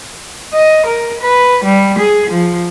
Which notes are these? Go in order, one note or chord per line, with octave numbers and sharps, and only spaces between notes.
D#5
A#4
B4
G3
G#4
F3